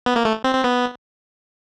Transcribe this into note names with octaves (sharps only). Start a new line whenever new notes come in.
B3
A#3
A3
C4
C4
B3